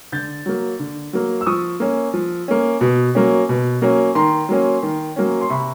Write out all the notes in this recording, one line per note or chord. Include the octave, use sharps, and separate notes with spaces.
D3 G6 A6
F#3 A#3
D3
F#3 A#3
E6
F3 C#6 D#6
A#3 C#4
F3
A#3 C#4
B2
F#3 A#3 C#4
B2
F#3 A#3 C#4
D#3 A#5 C6
F#3 A#3 C#4
D#3
F#3 A#3 C#4
C6
C3 B5 C#6